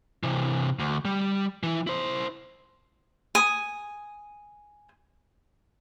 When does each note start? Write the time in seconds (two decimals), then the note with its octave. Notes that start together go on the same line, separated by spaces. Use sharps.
0.23 C3 E3
0.79 D2
1.05 G3
1.63 E3 E4
1.87 E4 C5
3.35 G#5 D#6